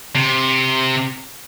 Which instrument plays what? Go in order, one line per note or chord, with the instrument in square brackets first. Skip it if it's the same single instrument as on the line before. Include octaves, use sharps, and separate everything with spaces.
[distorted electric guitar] C3